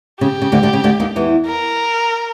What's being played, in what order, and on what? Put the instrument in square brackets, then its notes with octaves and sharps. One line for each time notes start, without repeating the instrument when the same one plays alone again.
[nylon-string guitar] C#3 [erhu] G4
[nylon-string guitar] C#3
D2 D3
D2 D3
C#3
D2 D3
D#2 D#3
E2 E3
[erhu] A#4